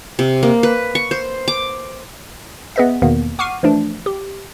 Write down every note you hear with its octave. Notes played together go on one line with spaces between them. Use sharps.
C3
A#3
B4
C#6
C5
D6
B3 G#4 B4 D#5 E5
E2 B2 D#3 A#3 B3
F#5 C#6 D6 F6 C7 D#7
E3 F3 A3 D4
G4